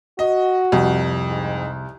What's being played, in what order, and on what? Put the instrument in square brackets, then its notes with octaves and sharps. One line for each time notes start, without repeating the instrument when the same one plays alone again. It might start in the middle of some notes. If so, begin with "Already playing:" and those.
[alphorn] F#4 [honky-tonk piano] D#5
[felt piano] C2 [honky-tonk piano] F2
[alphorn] G#2